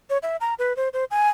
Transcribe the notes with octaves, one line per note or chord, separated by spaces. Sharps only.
C#5
E5
A#5
B4
C5
C5
G#5